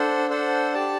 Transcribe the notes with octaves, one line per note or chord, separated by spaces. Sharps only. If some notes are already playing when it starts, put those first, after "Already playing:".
Already playing: D4 A4 C5 F#5
D4 A4 C5 F#5
G4 D5 A5